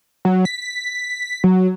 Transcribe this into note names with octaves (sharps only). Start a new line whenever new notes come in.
F#3
B6
F#3